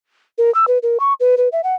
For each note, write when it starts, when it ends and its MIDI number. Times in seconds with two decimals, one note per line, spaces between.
0.38 0.53 70
0.55 0.65 88
0.68 0.78 71
0.83 0.98 70
1.00 1.13 85
1.20 1.35 71
1.38 1.49 71
1.52 1.61 76
1.64 1.75 78